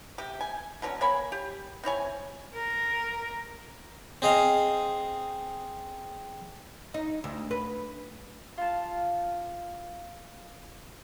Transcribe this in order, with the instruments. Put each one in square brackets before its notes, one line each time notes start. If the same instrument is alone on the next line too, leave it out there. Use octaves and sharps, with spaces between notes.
[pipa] C3 G4
G#5
B2 D3 F#3 C#4
A#3 C#5 G#5 B5
G4
C4 E4 C#5 G#5
[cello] A#4
[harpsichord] C4 G#4 D#5 F5
[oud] D#4
D2
B4
[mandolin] F4 A5